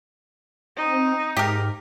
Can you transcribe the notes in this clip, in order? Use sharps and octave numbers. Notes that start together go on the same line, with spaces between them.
C4 D#4
G#2 G4 A#4